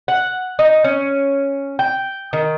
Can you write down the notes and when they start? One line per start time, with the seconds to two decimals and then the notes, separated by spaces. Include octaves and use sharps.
0.08 F#5
0.59 D#4
0.84 C#4
1.79 G5
2.33 D#3